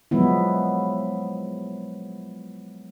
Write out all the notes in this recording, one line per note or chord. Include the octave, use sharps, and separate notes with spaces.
F3 F#3 G#3 B3 E4